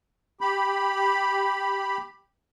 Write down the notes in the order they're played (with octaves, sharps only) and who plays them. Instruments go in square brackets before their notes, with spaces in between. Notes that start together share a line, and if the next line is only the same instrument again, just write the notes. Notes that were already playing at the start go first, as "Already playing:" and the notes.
[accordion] G4 B5